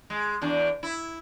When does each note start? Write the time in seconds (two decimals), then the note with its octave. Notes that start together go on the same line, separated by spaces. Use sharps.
0.10 G#3
0.42 E2 D4
0.83 E4